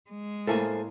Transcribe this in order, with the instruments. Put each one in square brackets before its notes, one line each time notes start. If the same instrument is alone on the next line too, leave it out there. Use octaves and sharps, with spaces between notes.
[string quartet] G#3
[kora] A2 A#3 [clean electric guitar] A4 C5 G#5